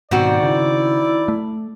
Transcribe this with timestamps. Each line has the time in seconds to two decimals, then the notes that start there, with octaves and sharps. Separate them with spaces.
0.11 G#2 B2 D#3 C4 F#4 D5
0.43 C#3 E4
1.28 A3